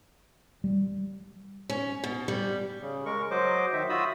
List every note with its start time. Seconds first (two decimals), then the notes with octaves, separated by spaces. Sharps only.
0.64 G3
1.69 C#4
2.04 B2
2.28 G3
2.81 C#3
3.06 G#3 A#4 C#6
3.31 F#3 C5 D#5 D6
3.73 D#3 D#4 E5
3.89 F4 F#4 E5 B5 D#6 E6